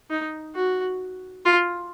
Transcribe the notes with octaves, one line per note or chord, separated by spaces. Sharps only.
D#4
F#4
F4